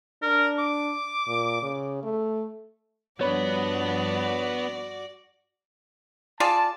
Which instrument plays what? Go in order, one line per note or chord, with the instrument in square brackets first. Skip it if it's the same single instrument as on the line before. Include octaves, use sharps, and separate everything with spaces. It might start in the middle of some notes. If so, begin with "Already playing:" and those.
[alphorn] D4 [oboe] A#4
[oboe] D6
[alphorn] A#2
C#3
A3
[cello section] G2 F3 D4 [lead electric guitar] B3 [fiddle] F#4 D5 [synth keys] C#5 B5
[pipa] F4 G#4 D5 [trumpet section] A5